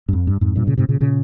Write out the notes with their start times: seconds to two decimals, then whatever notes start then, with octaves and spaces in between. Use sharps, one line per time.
0.09 G2
0.13 F2
0.27 G2
0.41 F2 G#2
0.56 G2 A#2
0.67 A#2 C#3
0.78 G#2 C3
0.89 A#2 C#3
1.00 A#2 C#3